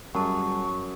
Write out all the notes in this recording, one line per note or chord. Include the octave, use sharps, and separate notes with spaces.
F#2 G3 G#4 F#5 A5 C#6